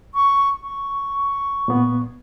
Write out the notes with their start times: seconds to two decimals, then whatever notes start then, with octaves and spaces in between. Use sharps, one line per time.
0.14 C#6
0.63 C#6
1.68 A#2 B3